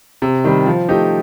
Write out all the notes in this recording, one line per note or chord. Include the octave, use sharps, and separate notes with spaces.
C3
D#3 G3
F3
A3 D#4 G4